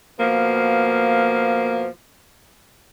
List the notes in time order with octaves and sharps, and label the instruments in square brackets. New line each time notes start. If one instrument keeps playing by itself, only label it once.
[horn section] B2 F3 A#3